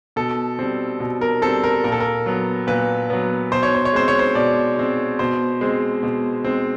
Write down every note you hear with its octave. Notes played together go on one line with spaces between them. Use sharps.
B2 A4
G3 C4
B2
A#4
G3 C4 A4
A#4
A#2 A#4
A4
A#4
F#3 B3
A#2 B4
F#3 B3
B2 C5
C#5
C5
C#5
G#3 C4 C5
C#5
C5
B2 D5
G#3 C4
B2 C5
G#3 C4
B2
G#3 C4